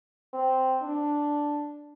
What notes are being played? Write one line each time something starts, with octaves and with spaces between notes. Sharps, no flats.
C4
D4